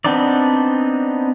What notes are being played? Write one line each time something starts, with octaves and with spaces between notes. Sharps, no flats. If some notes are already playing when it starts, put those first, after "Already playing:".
B3 C4 D4 D#4 D5